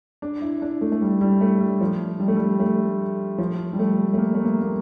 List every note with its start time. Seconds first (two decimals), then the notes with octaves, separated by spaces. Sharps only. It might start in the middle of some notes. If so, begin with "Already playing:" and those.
0.22 D4
0.42 E4
0.62 D4
0.81 A3
0.92 A3
1.02 G3
1.21 G3
1.41 A3
1.61 G3
1.81 F3
2.20 G3
2.28 A3
2.36 G3
2.60 A3
3.38 F3
3.73 G3
3.79 A3
4.13 A3
4.18 A#3
4.35 A3
4.44 A#3
4.62 A#3